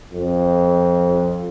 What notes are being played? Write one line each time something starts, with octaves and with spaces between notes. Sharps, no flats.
F2